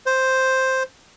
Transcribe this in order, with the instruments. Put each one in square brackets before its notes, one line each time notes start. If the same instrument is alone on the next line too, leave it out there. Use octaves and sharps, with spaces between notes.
[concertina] C5